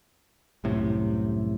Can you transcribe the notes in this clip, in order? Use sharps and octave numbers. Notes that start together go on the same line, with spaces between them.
C2 F#2 A2 C3